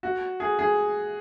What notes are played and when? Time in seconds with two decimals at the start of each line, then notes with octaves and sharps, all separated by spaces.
0.03 F#4
0.40 G#4
0.59 G#4